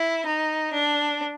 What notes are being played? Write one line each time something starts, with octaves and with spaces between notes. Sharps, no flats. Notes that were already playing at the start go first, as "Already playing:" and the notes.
Already playing: E4
D#4
D4